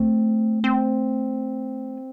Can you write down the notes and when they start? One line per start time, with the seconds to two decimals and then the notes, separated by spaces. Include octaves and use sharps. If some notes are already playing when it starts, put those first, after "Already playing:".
Already playing: A3 C4
0.64 C4